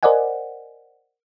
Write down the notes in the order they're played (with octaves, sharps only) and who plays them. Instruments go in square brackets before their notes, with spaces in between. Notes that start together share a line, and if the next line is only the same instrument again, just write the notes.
[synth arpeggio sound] A#4 C5 D5 D#5 F#5 G#5